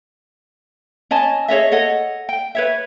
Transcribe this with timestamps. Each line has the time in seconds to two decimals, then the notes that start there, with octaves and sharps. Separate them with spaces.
1.11 C#4 D#5 G#5 A5
1.48 G#4 C#5 D#5 E5
1.71 A4 C#5 D#5 F#5
2.29 G5
2.55 B4 C#5 E5